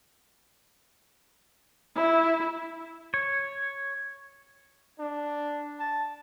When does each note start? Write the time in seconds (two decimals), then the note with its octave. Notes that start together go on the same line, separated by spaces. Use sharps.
1.96 E4
3.14 C#5
4.99 D4
5.80 A5